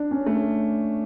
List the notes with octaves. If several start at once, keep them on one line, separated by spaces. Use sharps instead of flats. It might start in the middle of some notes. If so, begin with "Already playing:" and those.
Already playing: D4
C#4
A3